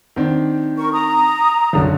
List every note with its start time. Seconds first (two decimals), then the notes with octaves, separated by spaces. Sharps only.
0.16 D#3 C4 D4
0.77 A#4 C#6
0.93 A#5 D#6
1.73 B1 F#2 D3